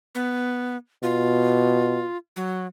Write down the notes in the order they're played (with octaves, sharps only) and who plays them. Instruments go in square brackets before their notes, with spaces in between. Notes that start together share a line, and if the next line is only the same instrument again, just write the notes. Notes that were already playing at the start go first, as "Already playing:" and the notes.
[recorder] B3
[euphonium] B2 [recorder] F4
[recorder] F#3